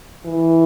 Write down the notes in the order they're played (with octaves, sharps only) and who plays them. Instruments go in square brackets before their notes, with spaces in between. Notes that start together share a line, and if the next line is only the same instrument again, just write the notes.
[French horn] E3